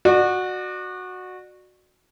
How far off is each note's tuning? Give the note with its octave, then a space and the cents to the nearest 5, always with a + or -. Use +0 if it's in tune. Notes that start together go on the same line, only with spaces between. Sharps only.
F#4 -10 D5 +35